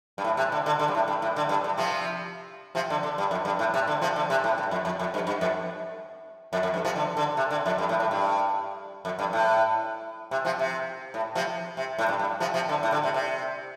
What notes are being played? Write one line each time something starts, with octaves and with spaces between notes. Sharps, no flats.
G2
A2
C3
D3
D3
D3
G2
A2
G2
A2
D3
G2
G2
C3 F3
C3 F3
D3
D3
G2
F2
G2
A2
C3
D3
C3 F3
D3
C3
A2
G2
F2
F2
F2
G2
G2
F2
F2
F2
G2
C3 F3
D3
D3
C3
D3
F2
G2
A2
A2
G2
F2
G2
A2
C3
C3 F3
C3
A2
C3 F3
C3
A2
G2
G2
C3 F3
C3 F3
D3
A2
D3
C3
C3